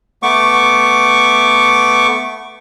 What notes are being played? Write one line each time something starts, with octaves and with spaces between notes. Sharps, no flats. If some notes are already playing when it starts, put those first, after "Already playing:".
A3 B3 C#6 D6